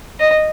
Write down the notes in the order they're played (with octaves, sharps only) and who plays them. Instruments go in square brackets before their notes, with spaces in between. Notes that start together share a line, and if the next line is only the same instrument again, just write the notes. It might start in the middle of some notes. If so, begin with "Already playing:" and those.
[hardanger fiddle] D#5